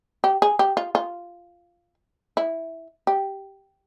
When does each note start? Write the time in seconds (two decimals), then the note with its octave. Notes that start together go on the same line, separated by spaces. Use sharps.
0.24 G4
0.42 G#4
0.59 G4
0.77 F4
0.95 F4
2.37 E4
3.07 G4